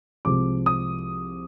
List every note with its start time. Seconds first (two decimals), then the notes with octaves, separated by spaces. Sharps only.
0.25 C2 C3 F3 G#3 D6
0.66 D#6